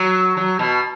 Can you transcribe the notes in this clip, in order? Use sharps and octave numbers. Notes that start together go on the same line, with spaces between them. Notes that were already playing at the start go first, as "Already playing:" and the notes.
Already playing: F#3
F#3
B2